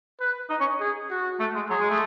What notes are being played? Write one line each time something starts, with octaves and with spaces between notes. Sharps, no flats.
B4
D#4
C#4
G#4
F#4
A3
G#3
F#3 G#4
G#3
A3